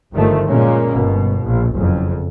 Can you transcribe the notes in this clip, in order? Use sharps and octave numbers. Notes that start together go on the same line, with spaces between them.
G1 G2 D#3 F3 A3
A#2 G#3 A#3 C#4
G1 B2
A#1
F#1 F2